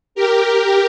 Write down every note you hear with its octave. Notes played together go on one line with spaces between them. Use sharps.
G4 A#4